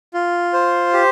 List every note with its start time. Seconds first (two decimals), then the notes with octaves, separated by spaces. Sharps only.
0.14 F4
0.53 C5
0.93 G4